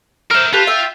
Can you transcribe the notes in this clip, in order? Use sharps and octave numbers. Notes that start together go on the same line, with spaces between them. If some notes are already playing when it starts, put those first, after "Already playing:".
A#4 C5 E5 F6
F4 G4 B4 A5
E5 G5